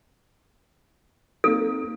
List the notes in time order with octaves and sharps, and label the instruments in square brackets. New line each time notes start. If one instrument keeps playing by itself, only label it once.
[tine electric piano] A#3 C4 D#4 [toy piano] A4